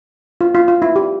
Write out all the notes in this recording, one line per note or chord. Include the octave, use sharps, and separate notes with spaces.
F4
F4
F4
E4
G4